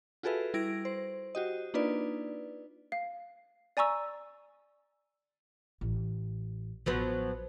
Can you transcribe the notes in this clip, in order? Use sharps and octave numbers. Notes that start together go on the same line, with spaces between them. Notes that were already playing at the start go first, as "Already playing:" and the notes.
F4 F#4 G#4 A4 B4 E5
G3 E4 G#6 A#6 D7
C5
F#4 G4 D#5
A#3 D4 D#4 F4 B4 D5
F5
D5 G#5 A#5 C#6 E6
A1
A1 F3 F#3 B3